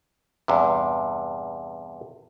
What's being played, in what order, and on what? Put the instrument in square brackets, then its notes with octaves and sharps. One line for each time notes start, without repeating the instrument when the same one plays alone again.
[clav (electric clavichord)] E2 G2 C3